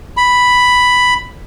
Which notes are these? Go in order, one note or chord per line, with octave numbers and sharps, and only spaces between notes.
B5